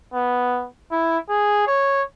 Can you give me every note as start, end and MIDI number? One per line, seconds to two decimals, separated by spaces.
0.14 0.67 59
0.91 1.18 64
1.30 1.67 68
1.67 2.02 73